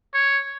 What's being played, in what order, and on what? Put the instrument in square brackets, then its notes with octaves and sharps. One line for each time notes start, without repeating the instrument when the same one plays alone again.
[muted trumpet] C#5